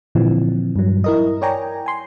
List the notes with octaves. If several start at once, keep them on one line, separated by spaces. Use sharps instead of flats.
A#2 D3 E3 F3 C4
G2 F#3
E4 A#4 D#5
A#4 C#5 D5 G5 G#5 A#5
G#5 C6